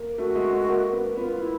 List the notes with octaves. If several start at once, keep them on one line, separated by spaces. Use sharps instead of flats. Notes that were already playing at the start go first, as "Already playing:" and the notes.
Already playing: A#3
A3 F#4
G#3
A3
A#3
B3
B3 F4
F4
E4